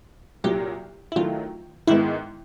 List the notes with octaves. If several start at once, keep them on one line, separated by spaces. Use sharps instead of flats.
C2 A#2 F#3 G4
E4
D#3 F#3 A3 F4
G#2 D#3 G#3 B3 E4